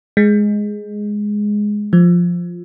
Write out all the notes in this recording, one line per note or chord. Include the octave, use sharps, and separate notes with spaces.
G#3
F3